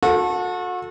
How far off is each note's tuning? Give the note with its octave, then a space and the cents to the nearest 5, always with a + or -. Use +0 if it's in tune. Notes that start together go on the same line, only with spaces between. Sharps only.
F#4 -35 A4 +0